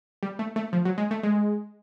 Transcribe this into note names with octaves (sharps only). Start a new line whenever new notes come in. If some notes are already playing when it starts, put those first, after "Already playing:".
G3
A3
A3
F3
F#3
G#3
A3
G#3